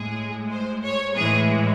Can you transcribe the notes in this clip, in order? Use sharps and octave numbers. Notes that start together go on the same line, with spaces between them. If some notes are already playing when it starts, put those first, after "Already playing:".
Already playing: A2 G#3 G#4
C5
C#5
A2 E3 G#3 G#4